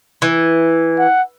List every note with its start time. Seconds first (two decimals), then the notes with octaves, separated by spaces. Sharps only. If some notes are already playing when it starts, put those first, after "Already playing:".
0.22 E3
0.99 F#5